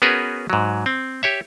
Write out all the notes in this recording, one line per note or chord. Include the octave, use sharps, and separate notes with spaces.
B3 C#4 F#4 G#4 A#4 B4
G#2 F#3
C4
G4 C#5 E5